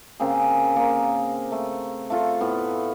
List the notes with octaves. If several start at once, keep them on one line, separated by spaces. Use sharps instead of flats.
C#3 A#3 C4 G#4
A#3
A3
A3 F4 A4
A2 B3